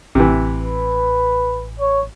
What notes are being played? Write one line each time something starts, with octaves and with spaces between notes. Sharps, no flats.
A1 C3 E3
B4
C#5